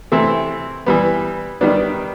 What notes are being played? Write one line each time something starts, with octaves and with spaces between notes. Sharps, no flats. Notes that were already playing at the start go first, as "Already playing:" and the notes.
C3 E3 A3 C4 E4
E3 G3 B3
D#3 G3 B3 D4